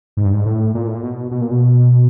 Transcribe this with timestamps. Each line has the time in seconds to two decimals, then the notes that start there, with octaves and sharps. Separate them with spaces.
0.17 G#2
0.25 G2
0.33 G#2
0.46 A2
0.74 A#2
0.87 A2
0.95 A#2
1.03 B2
1.31 B2
1.41 A#2
1.51 B2